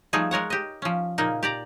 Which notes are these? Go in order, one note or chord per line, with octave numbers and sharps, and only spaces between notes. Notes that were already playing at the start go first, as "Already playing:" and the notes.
F3 G3 A3 B3 D#4 G#4
G#3 A#4 C#5 F#5
G4 D#5
F3 C#4
A#2 C#3 A#3 D#4
G4 D5 A#5